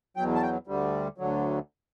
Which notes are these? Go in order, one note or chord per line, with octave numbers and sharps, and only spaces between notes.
E2 B2 F#3 G5
A5
G5
D2 D3 G3
D2 D3 F#3